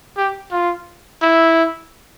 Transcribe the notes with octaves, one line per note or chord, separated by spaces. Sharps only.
G4
F4
E4